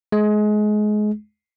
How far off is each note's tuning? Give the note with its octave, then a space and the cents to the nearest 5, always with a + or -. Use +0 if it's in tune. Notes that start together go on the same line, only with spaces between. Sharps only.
G#3 +25